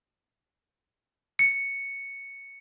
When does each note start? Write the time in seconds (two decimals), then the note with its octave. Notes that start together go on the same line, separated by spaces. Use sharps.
1.39 C#7